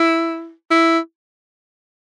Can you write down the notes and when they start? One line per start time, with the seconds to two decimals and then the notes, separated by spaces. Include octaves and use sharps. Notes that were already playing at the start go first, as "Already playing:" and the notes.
Already playing: E4
0.71 E4